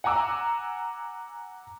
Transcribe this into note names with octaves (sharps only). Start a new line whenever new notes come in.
F#5 G#5 A#5 D6 E6